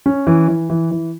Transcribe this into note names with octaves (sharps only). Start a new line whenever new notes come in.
C#4
E3
E3
E3
E3